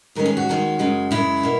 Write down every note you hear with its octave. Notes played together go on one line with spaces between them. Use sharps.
D#2 D#3 G#3 C#4 A#4
G#4
F#4
D#2 D#3 G#3 C#4
F#2 C#3 G#3
F#2 C#3 G#3 E4
B2 A#3